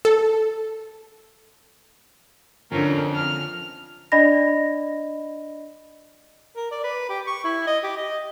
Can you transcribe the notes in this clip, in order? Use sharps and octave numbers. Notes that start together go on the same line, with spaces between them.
A4
F2 D3 F3 C#4 A#4
F6
D4 D5 D#5 B5 A#6
A#4
D5
B4
G4
C#6
E4
D#5
G4
D#5